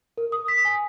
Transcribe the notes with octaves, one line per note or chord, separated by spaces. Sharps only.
A#4
D#6
B6
G#5